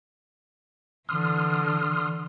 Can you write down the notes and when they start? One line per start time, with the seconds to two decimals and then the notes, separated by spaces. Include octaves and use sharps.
1.09 D3 E3 C6 D#6 F6